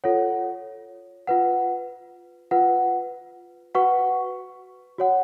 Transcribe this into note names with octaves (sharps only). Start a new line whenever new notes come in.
F4 A4 C#5 F#5
F4 B4 F#5
F4 B4 F#5
F#4 B4 F#5 C#6
F#4 C#5 F#5